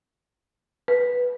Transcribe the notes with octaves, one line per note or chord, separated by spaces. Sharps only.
B4